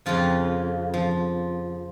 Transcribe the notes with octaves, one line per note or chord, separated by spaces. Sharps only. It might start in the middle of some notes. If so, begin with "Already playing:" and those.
F2 C#3 F3 F4
F3